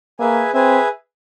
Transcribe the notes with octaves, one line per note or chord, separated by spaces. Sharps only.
A#3 G#4 B4 E5 G#5
C4 G#4 B4 E5 G#5